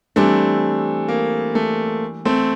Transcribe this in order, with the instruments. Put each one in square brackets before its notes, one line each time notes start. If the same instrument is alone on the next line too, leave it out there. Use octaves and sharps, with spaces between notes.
[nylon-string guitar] E3 G3 D4 [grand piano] A3 C4
[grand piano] A#3
A3
A3 C4